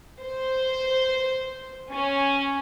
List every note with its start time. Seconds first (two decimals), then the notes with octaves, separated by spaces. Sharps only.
0.21 C5
1.91 C#4